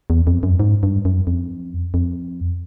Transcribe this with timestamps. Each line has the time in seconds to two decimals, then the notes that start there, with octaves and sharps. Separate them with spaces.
0.10 E2
0.27 F2
0.43 F#2
0.60 G#2
0.83 G2
1.05 F#2
1.27 F2
1.94 F2